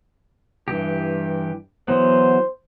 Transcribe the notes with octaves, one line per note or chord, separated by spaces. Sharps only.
G2 E3 G4
E3 F#3 B3 C5